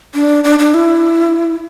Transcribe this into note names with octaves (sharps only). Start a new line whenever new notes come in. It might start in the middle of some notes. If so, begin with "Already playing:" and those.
D4
D4
D4
E4